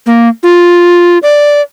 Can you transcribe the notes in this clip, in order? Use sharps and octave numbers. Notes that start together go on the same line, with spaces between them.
A#3
F4
D5